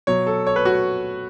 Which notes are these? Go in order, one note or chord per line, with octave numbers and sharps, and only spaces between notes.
B2 F#3 C#5
A4
C#5
B4
F#4